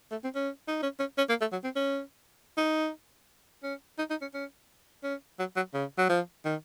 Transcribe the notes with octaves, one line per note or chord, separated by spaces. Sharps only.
A3
C4
C#4
D#4
C#4
C#4
C#4
A#3
A3
F#3
C4
C#4
D#4
C#4
D#4
D#4
C#4
C#4
C#4
F#3
F#3
C#3
F#3
F3
D#3